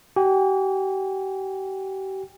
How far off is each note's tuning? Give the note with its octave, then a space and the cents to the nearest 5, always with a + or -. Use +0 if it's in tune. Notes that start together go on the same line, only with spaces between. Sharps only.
G4 -40 G#5 -45